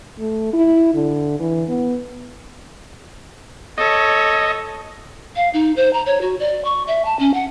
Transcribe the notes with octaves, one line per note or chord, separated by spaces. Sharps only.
A3
E4
D3
E3
B3
A4 C#5 D#5
F5
D#4
C5
A#5
C#5
F#4
D5
C#6
E5
A5
C#4
F#5